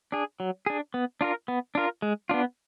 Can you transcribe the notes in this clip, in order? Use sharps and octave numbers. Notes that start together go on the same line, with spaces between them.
D4 G#4
F#3
D4 G#4
B3
D4 F4 A#4
B3
D4 F4 A#4
G#3
B3 D4 F4